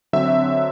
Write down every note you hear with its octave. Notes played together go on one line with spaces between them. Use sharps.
D3 F#3 C4 E5